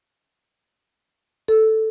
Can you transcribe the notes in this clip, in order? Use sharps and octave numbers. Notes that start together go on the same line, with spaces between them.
A4